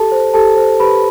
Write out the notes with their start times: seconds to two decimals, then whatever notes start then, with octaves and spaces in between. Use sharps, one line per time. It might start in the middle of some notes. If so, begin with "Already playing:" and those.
Already playing: G4 A4 A5
0.12 C5
0.34 G4 A4 A5
0.57 C5
0.80 G4 B4 B5